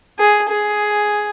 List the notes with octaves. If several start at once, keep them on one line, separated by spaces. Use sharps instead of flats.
G#4
G#4